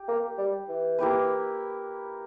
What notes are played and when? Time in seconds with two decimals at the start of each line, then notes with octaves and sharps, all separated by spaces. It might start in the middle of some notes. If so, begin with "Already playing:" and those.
Already playing: G4
0.08 A#3
0.38 G3
0.69 E3
0.99 A#3 E4 G4 B4